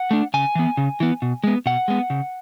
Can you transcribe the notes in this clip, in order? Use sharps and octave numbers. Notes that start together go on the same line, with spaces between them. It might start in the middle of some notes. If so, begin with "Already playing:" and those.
Already playing: F#5
A3 D4
C#3 G#5
E3 B3
C#3
E3 B3
B2
G#3 B3
B2 F#5
G#3 B3
C#3